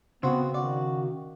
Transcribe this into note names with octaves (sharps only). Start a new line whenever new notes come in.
C#3 B3 C4 F#4
D#3 F#4 D5